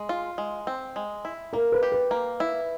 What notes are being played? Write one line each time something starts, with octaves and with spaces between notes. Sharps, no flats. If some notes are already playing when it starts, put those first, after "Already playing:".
Already playing: G#3
F4
G#3
C4
G#3
E4
A#3 A#4
B4
G4
B4
A#3
E4